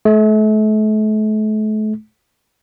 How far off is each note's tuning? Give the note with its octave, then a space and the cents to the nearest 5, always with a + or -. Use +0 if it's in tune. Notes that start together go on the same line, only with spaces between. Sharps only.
A3 -40